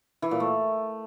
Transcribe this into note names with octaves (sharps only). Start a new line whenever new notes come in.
E3
A#2
A3